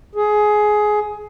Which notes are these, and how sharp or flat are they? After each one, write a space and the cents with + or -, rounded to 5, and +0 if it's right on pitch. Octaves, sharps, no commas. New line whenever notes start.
G#4 +15